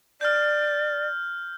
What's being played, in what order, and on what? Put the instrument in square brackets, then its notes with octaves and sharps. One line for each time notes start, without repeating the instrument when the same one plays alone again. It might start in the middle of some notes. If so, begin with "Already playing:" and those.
[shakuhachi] D5 [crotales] F6 G6